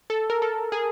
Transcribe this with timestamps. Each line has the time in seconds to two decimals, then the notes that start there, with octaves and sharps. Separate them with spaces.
0.10 A4
0.30 A#4
0.42 A4
0.72 G#4